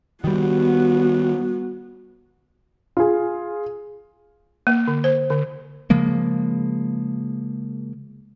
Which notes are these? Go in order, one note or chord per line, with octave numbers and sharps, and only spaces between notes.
D#3 G3 B3 F#4
F4 G#4
A#3
D3
C5
D3
C#3 F3 G#3 A#3